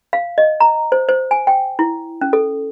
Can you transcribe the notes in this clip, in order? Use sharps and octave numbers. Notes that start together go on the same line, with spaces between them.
F5
D#5
A#5
C5
C5
G#5
G5
E4
C#4
A4